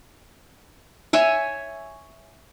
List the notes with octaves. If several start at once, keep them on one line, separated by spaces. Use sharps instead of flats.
C#5 E5 G#5